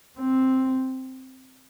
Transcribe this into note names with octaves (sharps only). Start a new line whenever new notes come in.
C4